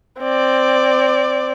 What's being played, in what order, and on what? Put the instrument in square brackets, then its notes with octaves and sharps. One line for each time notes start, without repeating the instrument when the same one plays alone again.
[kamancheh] C4 D5